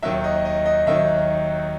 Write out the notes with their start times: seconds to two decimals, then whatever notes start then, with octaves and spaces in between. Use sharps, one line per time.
0.02 D#2 D#3 F#3 E5
0.24 D#5
0.45 D#5
0.66 D#5
0.86 D#2 D#3 F#3 E5